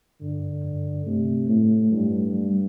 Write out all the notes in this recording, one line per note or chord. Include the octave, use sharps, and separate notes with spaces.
G2 D3
G2
C3 A3
A2 A3
G2 G3
G3